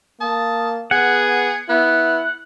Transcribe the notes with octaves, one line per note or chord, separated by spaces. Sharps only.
A#3 A5 D#6
B3 G#4 F#5 G#6
B3 E4 F#6